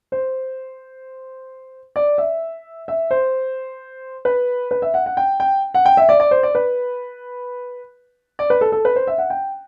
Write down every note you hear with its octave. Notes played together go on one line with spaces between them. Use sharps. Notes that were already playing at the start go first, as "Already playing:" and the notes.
C5
D5
E5
E5
C5
B4
B4
E5
F#5
F#5
G5
G5
F#5
G5
E5
D5
D5
C5
D5
B4
D5
B4
A4
A4
B4
C5
E5
F#5
G5